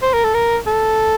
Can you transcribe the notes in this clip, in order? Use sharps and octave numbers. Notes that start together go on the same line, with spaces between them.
C5
A#4
A4
A#4
A4